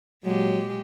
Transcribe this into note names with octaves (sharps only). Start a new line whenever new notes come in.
A#2 F#3 G#3 G4